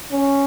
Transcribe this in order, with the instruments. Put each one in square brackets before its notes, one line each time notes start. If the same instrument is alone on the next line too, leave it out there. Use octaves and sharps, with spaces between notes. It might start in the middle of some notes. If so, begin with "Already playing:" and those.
[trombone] C#4